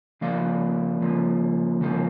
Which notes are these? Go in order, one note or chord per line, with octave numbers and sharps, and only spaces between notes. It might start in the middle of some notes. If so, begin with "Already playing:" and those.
C#3 F3 A#3 D5 F5
C#3 F3 A#3
C#3 F3 A#3